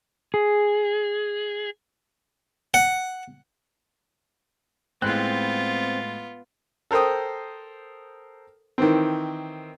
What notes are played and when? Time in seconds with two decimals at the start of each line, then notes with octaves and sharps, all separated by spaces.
0.34 G#4
2.74 F#5
5.02 A2 G#3 B3 C4 F4 F#6
6.91 A4 A#4 C5 G5 D#6
8.78 D#3 E3 C4